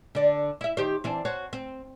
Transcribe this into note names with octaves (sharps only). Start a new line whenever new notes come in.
D3 D5
E4 E5
D#3 G4 C5
E3 C4 D4
F#4 C5 C#5
C4